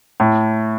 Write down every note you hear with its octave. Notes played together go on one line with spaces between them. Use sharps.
A2